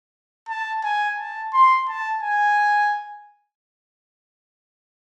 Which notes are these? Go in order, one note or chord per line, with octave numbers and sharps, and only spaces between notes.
A5
G#5
A5
C6
A5
G#5